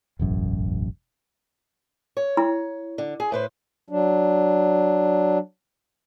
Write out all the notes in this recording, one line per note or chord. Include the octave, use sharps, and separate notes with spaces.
E1 A1 F#2
C#5
E4
D3
G#4
A2 B4 C5
F#3 D4